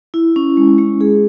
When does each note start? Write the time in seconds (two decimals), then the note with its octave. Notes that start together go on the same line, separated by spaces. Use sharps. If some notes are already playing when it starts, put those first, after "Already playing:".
0.14 E4
0.36 C#4
0.57 G#3
0.78 G#3
1.01 G#4